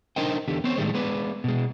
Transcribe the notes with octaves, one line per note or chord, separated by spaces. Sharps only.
D4 D#4 A#4 C5 D#5 G5
E2 D3 G4
B3 C4 C5 C#5
A2 D#3 G3 G#3
G#3 B3 B4 C#5 D5
B2 G#3